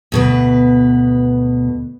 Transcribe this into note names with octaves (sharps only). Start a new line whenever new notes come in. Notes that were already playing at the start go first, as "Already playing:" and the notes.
D2 B2 B4